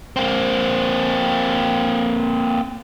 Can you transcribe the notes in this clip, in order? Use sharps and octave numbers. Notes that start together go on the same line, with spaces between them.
A#3 C4